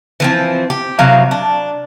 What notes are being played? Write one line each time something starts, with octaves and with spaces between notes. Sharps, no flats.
E3 F3 C4
G4
C3 F#3 E4 F5
D4